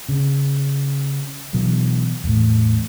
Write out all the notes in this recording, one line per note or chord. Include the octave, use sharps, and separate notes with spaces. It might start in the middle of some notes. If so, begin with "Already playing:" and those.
C#3
B2 E3 F#3
E2 A2